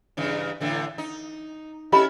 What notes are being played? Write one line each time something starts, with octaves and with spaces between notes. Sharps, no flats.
G2 C#3 E3
A2 D3 E3
D#4
C#4 E4 G4 A4 D#5 B5